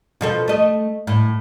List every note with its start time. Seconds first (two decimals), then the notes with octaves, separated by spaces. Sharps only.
0.21 B2 F3 A4
0.48 A3 D#5
1.07 A2